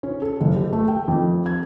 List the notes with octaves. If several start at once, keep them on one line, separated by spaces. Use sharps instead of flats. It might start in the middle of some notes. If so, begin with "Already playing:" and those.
C#4
A4
F#1
G4
A3
G5
F2
G#6